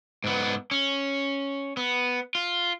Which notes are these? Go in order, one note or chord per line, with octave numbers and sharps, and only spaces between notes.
G#2 B3
C#4
B3
F4